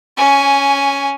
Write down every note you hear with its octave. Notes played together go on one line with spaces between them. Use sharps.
C#4 G#5